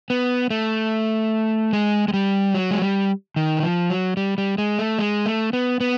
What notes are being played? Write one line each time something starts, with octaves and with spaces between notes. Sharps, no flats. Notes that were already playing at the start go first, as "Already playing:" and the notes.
B3
A3
G#3
G#3
G3
F#3
G#3
G3
D#3
E3
F3
F#3
G3
G3
G#3
A3
G#3
A3
B3
B3